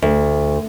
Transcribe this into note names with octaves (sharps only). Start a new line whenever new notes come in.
D2